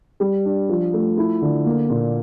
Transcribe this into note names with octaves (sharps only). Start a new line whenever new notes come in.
G3
D4
F3
A3
E4
D3
A#3
A#2